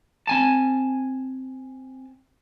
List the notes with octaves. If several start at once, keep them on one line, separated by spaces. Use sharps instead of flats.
C4 G#5 A5